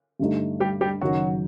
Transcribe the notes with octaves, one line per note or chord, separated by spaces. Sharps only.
G2 D3 A3 D#4
G3 G4
G3 G4
F#1 F#2 D#3 F#3 F#4